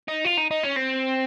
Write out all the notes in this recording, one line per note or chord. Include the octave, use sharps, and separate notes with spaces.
D#4
F4
D#4
D#4
C#4
C4